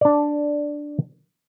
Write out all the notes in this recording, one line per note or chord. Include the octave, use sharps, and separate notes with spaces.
D4 D5